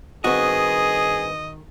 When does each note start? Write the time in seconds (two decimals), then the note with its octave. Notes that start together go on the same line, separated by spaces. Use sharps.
0.24 G2 D#3 C4 F#4 G#4 B4 D#5